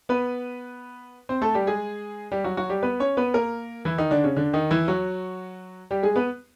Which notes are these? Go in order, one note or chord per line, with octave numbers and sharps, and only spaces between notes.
B3 B4
C4 C5
A3 A4
G3 G4
G#3 G#4
G3 G4
F#3 F#4
F#3 F#4
G3 G4
B3 B4
C#4 C#5
B3 B4
A#3 A#4
E3 E4
D#3 D#4
D3 D4
C#3 C#4
D3 D4
D#3 D#4
E3 E4
F#3 F#4
G3 G4
G#3 G#4
B3 B4